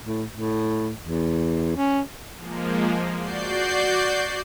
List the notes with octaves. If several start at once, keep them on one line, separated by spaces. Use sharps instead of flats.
A2
A2
E2
C#4
F3 G#3 A#3
F#4 D5 G6 C7